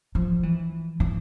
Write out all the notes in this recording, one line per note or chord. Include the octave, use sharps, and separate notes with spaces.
F3
E3
E3